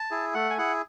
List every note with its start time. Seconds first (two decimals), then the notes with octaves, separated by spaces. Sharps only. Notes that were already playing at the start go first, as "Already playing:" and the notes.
Already playing: A5
0.11 E4 G#4
0.34 A3 F#5
0.50 G#5
0.58 E4 G#4 F#5